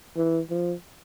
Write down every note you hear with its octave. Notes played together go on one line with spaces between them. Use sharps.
E3
F3